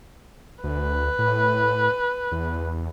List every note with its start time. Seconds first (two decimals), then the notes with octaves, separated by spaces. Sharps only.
0.64 D2 B4
1.19 A2
2.32 E2